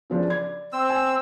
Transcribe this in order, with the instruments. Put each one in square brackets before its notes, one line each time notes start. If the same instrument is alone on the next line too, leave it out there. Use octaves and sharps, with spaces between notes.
[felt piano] C#3 F3 D4
D5 G#6
[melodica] C4 E6
[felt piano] G#5